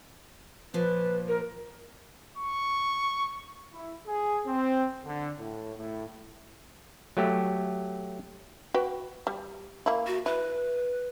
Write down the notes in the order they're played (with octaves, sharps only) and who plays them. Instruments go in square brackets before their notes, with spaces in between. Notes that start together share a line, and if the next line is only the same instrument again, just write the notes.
[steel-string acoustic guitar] A#2 F3 [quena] B4
[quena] A#4
[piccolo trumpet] C#6
[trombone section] E4
G#4
C4
D3
A2
A2
[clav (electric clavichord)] F#3 A3 G4
[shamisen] F#4 B4 G5
G3
A#3 E4
[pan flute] F#4
[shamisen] E4 [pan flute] B4